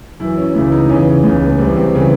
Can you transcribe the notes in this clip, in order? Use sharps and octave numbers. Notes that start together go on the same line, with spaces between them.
F#2 E3 E4
C#4
C#2 C#3 E3 E4
D#4
E2 C#3 E3 C#4
C#2 C#3 E3
C2 C3 E3 C4
C4
C#3 E3